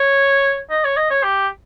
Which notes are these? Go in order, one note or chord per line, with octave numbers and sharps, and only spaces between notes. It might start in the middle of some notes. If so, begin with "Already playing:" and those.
Already playing: C#5
D#5
C#5
D#5
C#5
G4